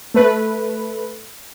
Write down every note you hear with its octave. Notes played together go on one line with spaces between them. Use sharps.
A3 B4